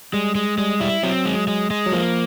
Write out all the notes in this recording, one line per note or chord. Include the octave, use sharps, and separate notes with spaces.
G3 G#3
G#3
G3 G#3
G3 E4
F#3 C4
G#3
G#3
G#3
F#3
F3 A#3